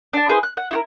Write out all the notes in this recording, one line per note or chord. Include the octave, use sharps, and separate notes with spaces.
D4 A5
E4 G#4 B4 C5
F#6
F#5
E4 F#4 A#4